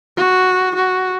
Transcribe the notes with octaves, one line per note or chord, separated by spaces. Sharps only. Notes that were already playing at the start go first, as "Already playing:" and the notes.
F#4
F#4